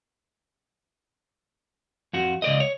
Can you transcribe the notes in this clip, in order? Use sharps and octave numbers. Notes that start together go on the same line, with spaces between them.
F2 F#4
C#2 D5 D#5
C#5